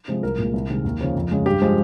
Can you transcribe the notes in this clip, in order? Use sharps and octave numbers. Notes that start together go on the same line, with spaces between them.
C3 F3 G#3
C2 A#4
A#2 G#3
C2
C3 D#3 G#3
D#2
C#3 F3
F2
C#3 G#3
G2 G4
F3 G#3